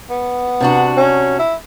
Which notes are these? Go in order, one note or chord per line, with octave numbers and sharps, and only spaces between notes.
B3
C3 D4 F#4
C#4
E4